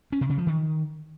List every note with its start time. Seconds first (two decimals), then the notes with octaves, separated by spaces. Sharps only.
0.12 C#4
0.21 C3
0.30 C#3
0.38 F3
0.47 D#3